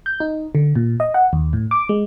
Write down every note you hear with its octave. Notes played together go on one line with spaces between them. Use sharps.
G6
D#4
D3
A#2
D#5
F#5
D#2
A2
D6
G#3